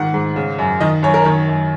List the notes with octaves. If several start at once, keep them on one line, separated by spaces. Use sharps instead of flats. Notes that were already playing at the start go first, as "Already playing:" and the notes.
Already playing: G#2 D#3 F#5
G#2
C#3
F#2
D#3 D#5
F#2 C#5
A#4
D#3 C#5
F#2